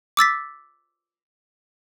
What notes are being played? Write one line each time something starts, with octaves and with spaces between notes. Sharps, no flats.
D6 E6 A6 B6